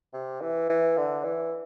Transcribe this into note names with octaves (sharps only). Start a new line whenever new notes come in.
C3
E3
E3
D3
E3